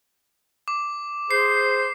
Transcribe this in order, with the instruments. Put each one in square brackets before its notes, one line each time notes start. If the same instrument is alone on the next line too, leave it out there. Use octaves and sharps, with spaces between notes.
[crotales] D6
[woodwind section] G#4 C5 [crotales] C7